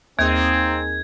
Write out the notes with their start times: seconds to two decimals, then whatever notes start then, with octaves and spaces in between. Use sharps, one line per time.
0.19 D#2 A#3 C4 D#4 G#4 G#6